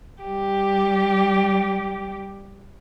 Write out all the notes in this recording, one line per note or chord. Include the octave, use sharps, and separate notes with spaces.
G3 G4